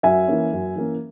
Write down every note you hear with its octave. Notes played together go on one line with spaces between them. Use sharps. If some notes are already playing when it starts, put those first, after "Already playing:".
F#2 E5 G#5
E3 A#3 C#4
F#2
E3 A#3 C#4